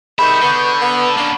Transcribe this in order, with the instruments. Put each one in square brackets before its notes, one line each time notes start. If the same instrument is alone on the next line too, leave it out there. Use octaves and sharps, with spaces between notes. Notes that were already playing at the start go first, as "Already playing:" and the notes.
[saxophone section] C3 D#3 G#4 [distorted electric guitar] G3 E5 [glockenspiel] B5 [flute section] C#6 G6
[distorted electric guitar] D3 [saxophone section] B3
[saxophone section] B3
[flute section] A5
[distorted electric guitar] A#3 C#4 [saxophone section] D4